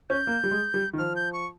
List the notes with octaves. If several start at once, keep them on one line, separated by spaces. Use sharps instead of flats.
C#4 G6
A#3
G3
G#3
G3
D#3
F3 F6
G6
C#6